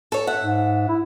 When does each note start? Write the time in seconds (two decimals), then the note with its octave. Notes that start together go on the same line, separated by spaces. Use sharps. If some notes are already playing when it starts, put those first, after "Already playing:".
0.12 A4 C#5
0.27 E5 F#5
0.43 G#2
0.88 E4